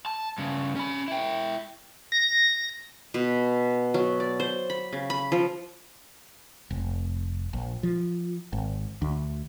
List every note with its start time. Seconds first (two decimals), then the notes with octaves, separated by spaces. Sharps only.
0.06 A5
0.38 G2 C#3
0.76 C#4 B5
1.08 E4 G5
2.12 A#6
3.14 B2
3.94 F#3
4.20 D5
4.40 C5
4.70 B5
4.93 C#3
5.10 B5
5.32 F3
6.71 F1
7.53 A#1
7.83 F3
8.53 G#1
9.02 D2